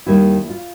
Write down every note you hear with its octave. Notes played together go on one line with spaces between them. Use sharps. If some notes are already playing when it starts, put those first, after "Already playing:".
D#2 D#3 G3 A#3 E4
F4